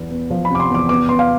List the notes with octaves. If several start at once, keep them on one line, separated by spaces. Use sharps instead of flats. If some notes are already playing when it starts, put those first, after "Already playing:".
Already playing: E2 B3
B3
F3
C3 B5
D6
C6
E2 D6
B3 D6
B3 C6
F5